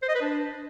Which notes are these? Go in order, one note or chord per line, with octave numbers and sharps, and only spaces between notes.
C5
D#5
B4
D4